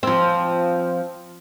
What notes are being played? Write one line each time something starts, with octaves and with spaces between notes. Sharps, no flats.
F3 C4